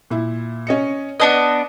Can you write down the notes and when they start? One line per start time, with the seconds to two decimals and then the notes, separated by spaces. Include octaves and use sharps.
0.11 A#2 E4
0.67 C#4 D#5 C#7
1.20 B3 D4 B4 D#5